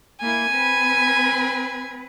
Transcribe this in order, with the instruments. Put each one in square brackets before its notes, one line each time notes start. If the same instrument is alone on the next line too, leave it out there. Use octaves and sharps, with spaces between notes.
[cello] A#3 E4 [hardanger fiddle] G#5
[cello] C4 B4